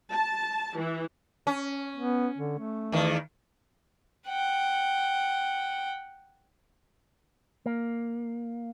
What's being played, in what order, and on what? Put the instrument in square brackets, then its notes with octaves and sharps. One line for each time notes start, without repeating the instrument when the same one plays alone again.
[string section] A5
E3
[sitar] C#4
[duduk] B3
D3
A3
[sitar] E2 D#3
[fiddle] F#5 G5
[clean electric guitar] A#3